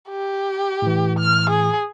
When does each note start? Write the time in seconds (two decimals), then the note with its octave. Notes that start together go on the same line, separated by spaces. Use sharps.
0.10 G4
0.82 A2 E3
1.19 F6
1.50 G#4